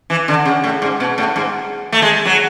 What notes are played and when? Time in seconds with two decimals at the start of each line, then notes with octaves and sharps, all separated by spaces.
0.10 E3
0.28 D3
0.45 C#3
0.64 A2
0.82 G#2
1.00 B2
1.18 A2
1.36 G#2
1.92 A3
2.02 G#3
2.25 F#3